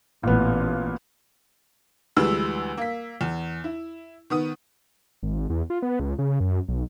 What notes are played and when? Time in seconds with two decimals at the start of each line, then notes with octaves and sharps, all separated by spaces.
0.23 A1 A#2 B3
2.17 D2 E3 G3 G#3 B4 E6
2.77 A#3 B6
3.21 E2
3.64 E4
4.30 D#3 B3 D#6
5.23 G#1
5.50 E2
5.70 F4
5.82 B3
6.00 C#2
6.19 C#3
6.40 F#2
6.68 B1